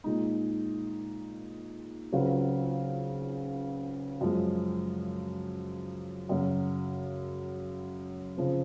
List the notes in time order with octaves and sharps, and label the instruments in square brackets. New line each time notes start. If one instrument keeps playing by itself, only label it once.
[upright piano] A#2 G#3 D#4
C#2 C#3 F#3 C4 F4
F#2 F3 G#3
F#2 C#3 F#3
C#3 F3 C4